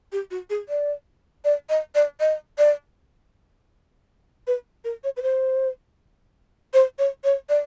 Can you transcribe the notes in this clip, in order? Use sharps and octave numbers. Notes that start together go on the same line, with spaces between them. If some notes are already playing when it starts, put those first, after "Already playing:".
G4
F#4
G#4
D5
D5
D#5
D5
D#5
D5
B4
A#4
C#5
B4
C5
C5
C#5
C#5
D5